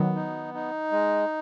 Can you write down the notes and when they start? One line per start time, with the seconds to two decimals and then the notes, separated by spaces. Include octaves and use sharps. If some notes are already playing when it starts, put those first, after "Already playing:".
Already playing: D#3 F#3 B3
0.15 D#4
0.54 D#4
0.92 G#3